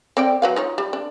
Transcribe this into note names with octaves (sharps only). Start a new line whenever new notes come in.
C4 D5 G5
F#3 B4 F5
D#4 F4 C#5
G3
D4